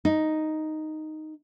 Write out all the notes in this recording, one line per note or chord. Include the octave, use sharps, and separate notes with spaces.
D#4